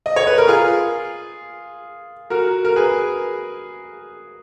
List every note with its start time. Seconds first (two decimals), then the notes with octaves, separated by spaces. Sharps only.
0.06 D#5
0.16 C#5
0.27 B4
0.38 A#4
0.48 F4 G#4
2.30 F#4 A#4
2.65 A#4
2.76 G#4 B4